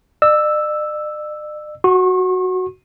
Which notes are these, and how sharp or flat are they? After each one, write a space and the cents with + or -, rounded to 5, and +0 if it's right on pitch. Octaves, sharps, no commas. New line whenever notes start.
D5 +45 E6 +0
F#4 +0 C#6 -40